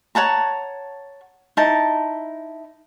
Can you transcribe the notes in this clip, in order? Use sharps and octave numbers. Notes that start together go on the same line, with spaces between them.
C#5 F#5 A5 A#5
D#4 E4 A5